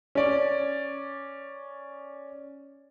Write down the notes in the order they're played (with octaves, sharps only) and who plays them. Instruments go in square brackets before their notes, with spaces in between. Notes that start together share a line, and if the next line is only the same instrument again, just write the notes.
[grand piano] C#4 D5